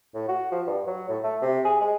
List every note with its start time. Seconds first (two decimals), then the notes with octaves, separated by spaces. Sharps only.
0.14 A2
0.28 F#4
0.52 F3
0.67 G2
0.86 F#3
1.09 A2
1.24 A3
1.42 C3
1.64 G#4
1.81 G#3